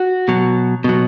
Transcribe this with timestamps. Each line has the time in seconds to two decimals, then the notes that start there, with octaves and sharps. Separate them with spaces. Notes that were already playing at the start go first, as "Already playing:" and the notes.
Already playing: F#4
0.28 B2 F#3
0.84 B2 F#3